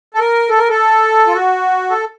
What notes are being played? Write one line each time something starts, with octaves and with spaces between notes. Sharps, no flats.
A4
A#4
A4
A#4
A4
F4
F#4
A4